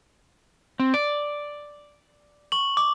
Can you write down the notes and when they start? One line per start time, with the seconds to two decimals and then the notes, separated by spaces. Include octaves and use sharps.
0.80 C4
0.94 D5
2.52 C#6 F#7
2.77 D6